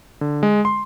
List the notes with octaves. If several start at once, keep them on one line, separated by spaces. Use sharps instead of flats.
D3
G#3
C6